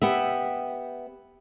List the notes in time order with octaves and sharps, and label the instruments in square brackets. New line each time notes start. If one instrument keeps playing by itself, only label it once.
[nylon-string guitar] B3 G4 E5